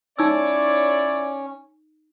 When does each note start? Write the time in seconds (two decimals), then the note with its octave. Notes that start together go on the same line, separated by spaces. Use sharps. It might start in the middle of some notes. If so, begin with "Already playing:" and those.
0.19 C#4 D#4 E4 C#5 D5 E6